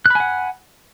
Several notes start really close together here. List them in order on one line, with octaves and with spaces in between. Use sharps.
F#6 B5 G#5 F#5